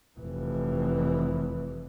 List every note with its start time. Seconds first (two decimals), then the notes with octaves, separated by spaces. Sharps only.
0.19 F1 E3